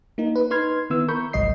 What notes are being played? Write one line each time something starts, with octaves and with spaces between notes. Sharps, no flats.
A#3 D#4
B4
D#4 B4 C6 F6 G#6
D#3 B3 E4 E6
A#4 B5 C#6 G6
G1 C2 G#2 F#3 D#5 C7